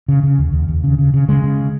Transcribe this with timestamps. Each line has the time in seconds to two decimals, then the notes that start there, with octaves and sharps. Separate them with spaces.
0.08 C#3
0.23 C#3
0.39 D#2
0.53 D#2
0.68 D#2
0.84 C#3
0.99 C#3
1.14 C#3
1.28 C#3 G#3
1.43 C#3